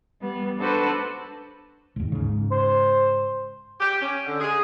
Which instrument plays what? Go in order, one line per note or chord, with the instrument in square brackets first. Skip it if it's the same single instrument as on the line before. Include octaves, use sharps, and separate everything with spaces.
[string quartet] G3 B3
D4 F#4 A4 B4 C5
[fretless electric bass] G#1 D#2
G#2 C#3
[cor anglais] C5
[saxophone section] G4
C#4
D3
G#4